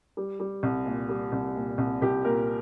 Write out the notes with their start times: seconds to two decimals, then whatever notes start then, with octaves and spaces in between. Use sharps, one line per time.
0.17 G3
0.40 G3
0.63 C2
0.86 A#2
1.09 G3
1.32 C2
1.56 A#2
1.78 C2
2.02 C2 G4
2.24 A#2 A#4